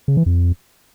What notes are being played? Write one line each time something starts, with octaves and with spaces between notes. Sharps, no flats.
C#3
E3
F2